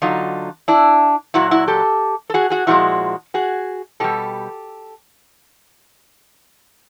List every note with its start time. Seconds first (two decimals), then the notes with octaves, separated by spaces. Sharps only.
0.02 D3 F#3 D#4 F4
0.68 D4 E4
1.34 A#2 F#3 E4 F#4
1.51 E4 F#4
1.68 G4 A4
2.30 A4
2.34 F#4 G#4
2.50 F#4 G#4
2.67 A#2 F3 G#3 E4 F#4
3.34 F#4 G#4
4.00 B2 G3 G4 A4